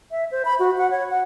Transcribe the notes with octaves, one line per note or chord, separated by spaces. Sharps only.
E5
C5
B5
F#4
F#5
C#5
F#5